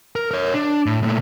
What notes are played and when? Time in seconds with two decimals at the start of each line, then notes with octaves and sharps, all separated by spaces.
0.16 A#4
0.31 A#4 C#5
0.54 D4
0.86 A2
1.03 A#2 A3